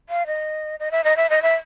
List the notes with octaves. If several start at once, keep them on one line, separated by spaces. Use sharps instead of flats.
F5
D#5
D#5
E5
D#5
E5
D#5
E5